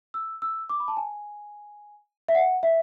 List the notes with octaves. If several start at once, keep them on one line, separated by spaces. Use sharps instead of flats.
E6
E6
D6
B5
A5
G#5
E5
F#5
E5